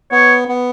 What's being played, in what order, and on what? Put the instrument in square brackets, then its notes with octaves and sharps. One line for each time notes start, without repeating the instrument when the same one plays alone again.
[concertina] B3 [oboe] C#5
[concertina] B3